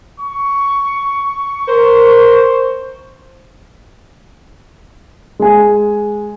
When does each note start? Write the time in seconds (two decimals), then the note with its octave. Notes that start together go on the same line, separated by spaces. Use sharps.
0.19 C#6
1.68 A#4 C5
5.40 G#3 G#5